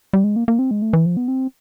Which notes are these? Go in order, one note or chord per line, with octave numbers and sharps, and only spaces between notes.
G3
G#3
A#3
A#3
C4
G#3
A3
E3
F3
B3
C4